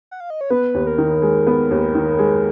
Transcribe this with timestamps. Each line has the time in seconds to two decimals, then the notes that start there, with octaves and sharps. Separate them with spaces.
0.11 F#5
0.20 F5
0.30 D#5
0.41 C#5
0.50 B3 B4
0.74 D#2
0.87 A#4
0.98 D#3
1.22 G#3
1.47 B3
1.71 D#2
1.95 D#3
2.19 G#3